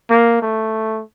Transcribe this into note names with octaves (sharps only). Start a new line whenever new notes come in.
A#3
A3